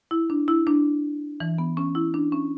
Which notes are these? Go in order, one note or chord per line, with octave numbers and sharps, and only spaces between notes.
E4
D4
E4
D4
E3
B3
C#4
E4
D4
C#4